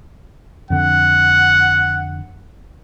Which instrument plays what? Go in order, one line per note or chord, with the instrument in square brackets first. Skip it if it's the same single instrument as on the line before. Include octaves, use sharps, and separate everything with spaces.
[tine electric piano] F2 D3 [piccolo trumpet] F#5